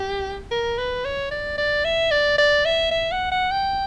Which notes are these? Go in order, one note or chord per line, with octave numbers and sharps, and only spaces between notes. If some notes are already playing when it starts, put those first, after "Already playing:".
Already playing: G4
A#4
B4
C#5
D5
D5
E5
D5
D5
E5
E5
F#5
F#5
G5